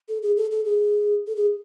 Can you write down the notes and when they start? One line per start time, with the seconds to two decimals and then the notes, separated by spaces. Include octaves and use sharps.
0.09 A4
0.22 G#4
0.37 A4
0.51 A4
0.65 G#4
1.27 A4
1.36 G#4